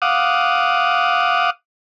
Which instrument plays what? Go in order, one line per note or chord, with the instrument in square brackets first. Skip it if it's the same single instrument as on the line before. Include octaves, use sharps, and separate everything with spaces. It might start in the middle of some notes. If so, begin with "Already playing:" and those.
[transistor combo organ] F5 F#5 D6 D#6